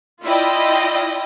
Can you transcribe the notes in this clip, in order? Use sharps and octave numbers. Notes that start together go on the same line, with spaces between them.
E4 F4 D5 D#5 G5